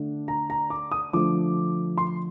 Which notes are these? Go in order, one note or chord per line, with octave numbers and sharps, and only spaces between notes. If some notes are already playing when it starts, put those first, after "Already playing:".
Already playing: D3 A3 D4
A#5
A#5
D6
D#6
D3 F3 A3 D6
C6